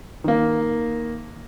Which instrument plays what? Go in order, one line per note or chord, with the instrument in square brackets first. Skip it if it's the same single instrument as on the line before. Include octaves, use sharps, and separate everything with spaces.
[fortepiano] D#3 A#3